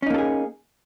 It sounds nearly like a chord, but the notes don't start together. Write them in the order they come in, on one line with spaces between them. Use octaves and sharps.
C#4 D#4 A#3 A4 G#4